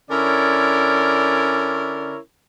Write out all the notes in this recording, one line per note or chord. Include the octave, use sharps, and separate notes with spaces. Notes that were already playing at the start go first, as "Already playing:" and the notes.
D3 C#4 E4 A#4 C#5 D5